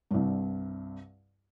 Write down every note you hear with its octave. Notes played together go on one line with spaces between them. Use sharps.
C2 G2